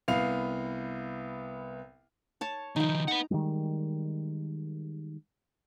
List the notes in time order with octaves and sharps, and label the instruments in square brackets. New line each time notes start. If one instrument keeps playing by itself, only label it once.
[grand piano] C2 B3 F5 C7 F7
[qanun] C#5 A5
[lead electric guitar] D#3 F3 [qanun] D#4 G5
[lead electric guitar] B4 F#5 [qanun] A#5
[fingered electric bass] D#3 E3 G3 G#3